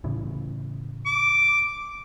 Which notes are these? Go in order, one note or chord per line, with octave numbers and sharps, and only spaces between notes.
A2 C#3 E3
D6